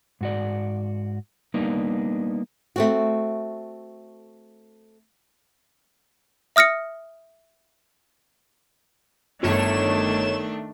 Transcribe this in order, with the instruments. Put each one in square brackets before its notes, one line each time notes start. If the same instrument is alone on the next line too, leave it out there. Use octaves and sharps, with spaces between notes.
[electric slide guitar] G#2 F#4 D5
G3 A#3 B3 D4 D#4
[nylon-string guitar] A3 C4 F#4
[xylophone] E5 D#6 F6 A#6 C#7
[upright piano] G1 [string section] D#3 A3 D4 [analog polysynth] C#5 E7